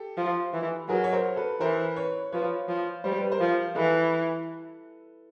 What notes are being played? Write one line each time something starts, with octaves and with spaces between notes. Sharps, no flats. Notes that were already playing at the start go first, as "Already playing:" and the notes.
Already playing: G4 A4
F3
E3
F#3 G#4 A#4
C#5
A#4 C5
A4 B4
E3 A#4 C5
B4 C#5
F3 B4 C#5
F3
G3 C5
B4
A#4 C5
F3
E3 A4 B4